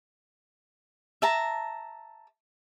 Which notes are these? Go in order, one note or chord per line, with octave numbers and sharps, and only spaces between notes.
E5 A5 A#5